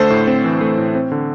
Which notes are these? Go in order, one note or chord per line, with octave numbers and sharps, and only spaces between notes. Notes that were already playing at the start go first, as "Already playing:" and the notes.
Already playing: D3 A3 A4 C5
A2
C4
E3
A3
A2
C4
D3